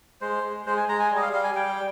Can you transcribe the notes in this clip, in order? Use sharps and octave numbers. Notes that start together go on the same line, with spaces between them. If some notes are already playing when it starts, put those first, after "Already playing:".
G#3 C5
G#3
G#3 C5
G#5
G#3 A#5
G#5
G3
D#5
F5
G3 F5
G#5
G3 G5